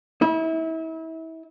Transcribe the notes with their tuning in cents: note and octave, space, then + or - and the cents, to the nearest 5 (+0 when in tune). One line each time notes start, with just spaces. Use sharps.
E4 -30